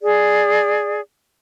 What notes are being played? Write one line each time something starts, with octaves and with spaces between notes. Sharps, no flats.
G#4 D5